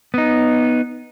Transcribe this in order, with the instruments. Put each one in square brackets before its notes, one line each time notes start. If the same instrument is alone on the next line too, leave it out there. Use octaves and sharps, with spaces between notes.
[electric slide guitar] B3 D#4